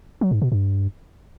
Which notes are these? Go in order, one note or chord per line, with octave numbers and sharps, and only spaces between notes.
F#3
G#2
B2
G2